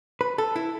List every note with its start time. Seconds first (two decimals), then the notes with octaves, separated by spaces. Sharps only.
0.21 B4
0.38 A4
0.56 E4